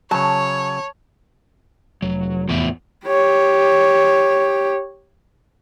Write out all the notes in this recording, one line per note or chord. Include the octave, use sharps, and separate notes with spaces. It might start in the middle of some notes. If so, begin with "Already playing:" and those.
C#3 F#3 C#5 A5
F1 F#3
E2 A2 B3 E5
G4 C#5